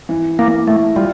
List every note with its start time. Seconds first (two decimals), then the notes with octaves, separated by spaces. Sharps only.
0.09 E3
0.39 E3 A#3
0.68 A3 E4
0.96 G3 F4